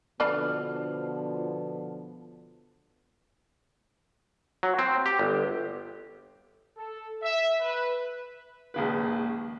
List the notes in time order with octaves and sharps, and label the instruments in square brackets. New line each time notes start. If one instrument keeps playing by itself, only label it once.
[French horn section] B2 D3 F3 [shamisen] D4 A4 B4 [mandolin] F6
[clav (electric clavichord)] F#3
C4
G4
G1
[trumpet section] A4
E5
B4
[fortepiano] A#1 D#2 C#3 G#3 B4